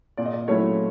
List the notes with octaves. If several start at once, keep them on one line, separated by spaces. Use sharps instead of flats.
A#2 D5
D#5
D5
F#3 A3 C#4 E4 C#5